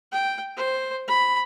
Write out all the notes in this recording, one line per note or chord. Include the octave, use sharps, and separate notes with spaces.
G5
C5
B5